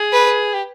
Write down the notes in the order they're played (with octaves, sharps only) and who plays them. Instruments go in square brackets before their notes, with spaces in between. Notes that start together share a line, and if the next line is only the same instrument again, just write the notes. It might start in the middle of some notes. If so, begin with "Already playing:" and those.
Already playing: [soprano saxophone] G#4
[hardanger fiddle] B4
[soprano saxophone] G4